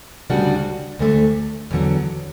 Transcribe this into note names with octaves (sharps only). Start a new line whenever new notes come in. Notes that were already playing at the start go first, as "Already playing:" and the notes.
D2 C#3 G3 D4 F#4
D2 D3 A3
E2 D3 F#3